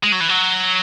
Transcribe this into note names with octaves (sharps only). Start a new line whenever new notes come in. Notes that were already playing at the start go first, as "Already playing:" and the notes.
G#3
F#3
E3
F#3